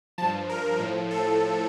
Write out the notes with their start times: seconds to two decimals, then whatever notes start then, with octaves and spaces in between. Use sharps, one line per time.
0.18 G2 F3 A5
0.50 A#4
0.79 A2 F3
1.11 A4